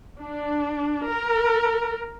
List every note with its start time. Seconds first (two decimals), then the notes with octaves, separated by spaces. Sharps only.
0.21 D4
1.09 A#4